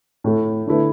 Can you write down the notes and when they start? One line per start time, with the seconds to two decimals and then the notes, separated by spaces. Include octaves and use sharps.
0.24 A2 A3 E4
0.67 D3 A3 E4 B4